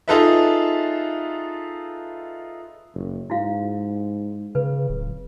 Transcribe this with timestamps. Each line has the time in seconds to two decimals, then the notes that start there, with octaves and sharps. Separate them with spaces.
0.08 D#4 F4 G#4 A4 B4 E5
2.95 F#1
3.30 G#2 E4 F#4 F5
4.55 C#3 B4
4.89 D1